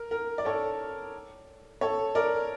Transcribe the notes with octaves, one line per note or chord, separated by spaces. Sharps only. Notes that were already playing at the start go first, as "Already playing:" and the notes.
Already playing: A#4
A#4
D5
A4 C#5
A4 C#5
A#4 D5